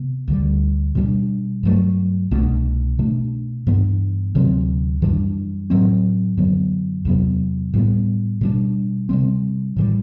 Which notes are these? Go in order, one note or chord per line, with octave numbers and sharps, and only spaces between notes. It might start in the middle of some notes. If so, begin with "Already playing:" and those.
Already playing: C3 B3
D2 D3 G3
B2 G3 D4
G2 F#3 A3
C2 B2 A3 D4
B2 A3 D4
G2 E3 B3 D4
D2 C3 F#3 C4
F#2 E3 G3 D4
A2 F#3 C4
F#2 D3 F#3 B3
E2 C3 F#3 B3
A2 G3 B3
B2 G3 D4
C3 G3 C4
A2 E3 G3